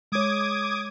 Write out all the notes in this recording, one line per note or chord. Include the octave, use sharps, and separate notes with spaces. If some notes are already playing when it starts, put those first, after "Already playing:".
G#3 C#5 D6 D#6 G#6